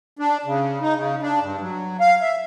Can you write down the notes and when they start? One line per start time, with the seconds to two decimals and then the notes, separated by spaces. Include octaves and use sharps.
0.19 D4
0.45 C#3
0.81 D#4
0.96 C#3
1.22 D4
1.41 G2
1.61 F#3
2.00 F5
2.21 E5